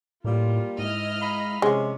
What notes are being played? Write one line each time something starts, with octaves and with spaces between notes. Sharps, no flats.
A2 G3 A#3 F4
G#2 E4 D#5 F6
F5 A#5 B5
C3 F3 G#3 C#4